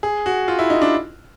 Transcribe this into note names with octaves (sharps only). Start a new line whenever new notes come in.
G#4
F#4
F4
E4
D#4
D4